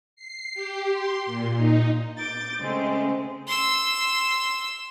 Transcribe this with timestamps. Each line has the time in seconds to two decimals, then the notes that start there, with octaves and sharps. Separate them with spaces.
0.16 C7
0.54 G4
0.93 C6
1.26 A#2
1.57 D#4
2.18 D6 G6 A6
2.60 C#3 G#3 A3 C4 C#4
3.47 C6 E6